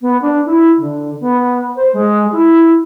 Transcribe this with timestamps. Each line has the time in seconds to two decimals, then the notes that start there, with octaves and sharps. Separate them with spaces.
0.01 B3
0.22 D4
0.45 E4
0.78 D3
1.20 B3
1.76 C5
1.93 G#3
2.32 E4